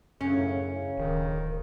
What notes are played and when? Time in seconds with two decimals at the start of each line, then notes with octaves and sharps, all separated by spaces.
0.21 F#2 A2 C#3 C#4
0.68 C#3
0.97 D1 D#3